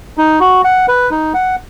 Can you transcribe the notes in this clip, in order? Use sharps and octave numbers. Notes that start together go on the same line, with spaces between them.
D#4
F#4
F#5
B4
D#4
F#5